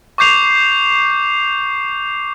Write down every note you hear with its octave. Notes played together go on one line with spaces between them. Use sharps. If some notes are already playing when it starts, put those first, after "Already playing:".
C#6 D6 G6 C7 F7